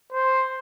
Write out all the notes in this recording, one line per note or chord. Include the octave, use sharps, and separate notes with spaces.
C5